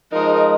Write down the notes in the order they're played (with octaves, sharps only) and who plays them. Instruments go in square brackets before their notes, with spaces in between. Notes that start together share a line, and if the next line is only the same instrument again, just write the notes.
[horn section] F3 G#3 D#4 [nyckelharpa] A#4